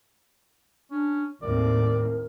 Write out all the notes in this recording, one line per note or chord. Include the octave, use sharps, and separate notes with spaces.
C#4 D4
D#2 A2 C4 A#4 D5